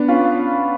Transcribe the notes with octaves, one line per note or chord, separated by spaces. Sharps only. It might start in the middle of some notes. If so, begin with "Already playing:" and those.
Already playing: B3 D4
C#4 F4